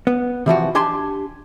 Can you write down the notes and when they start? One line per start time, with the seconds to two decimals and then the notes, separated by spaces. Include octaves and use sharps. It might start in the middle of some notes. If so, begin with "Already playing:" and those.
0.07 B3
0.46 C3 E3 F3 F#4
0.75 D4 G4 G#5 A5 C6